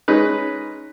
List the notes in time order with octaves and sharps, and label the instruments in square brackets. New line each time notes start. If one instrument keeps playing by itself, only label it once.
[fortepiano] G#3 C#4 D#4 B4